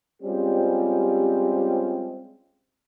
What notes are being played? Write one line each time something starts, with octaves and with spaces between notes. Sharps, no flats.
G3 G#3 C4 C#4 F4 G4